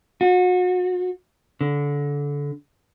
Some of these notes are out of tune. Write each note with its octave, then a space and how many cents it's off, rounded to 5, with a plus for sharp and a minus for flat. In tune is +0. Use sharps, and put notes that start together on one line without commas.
F#4 -35
D3 -25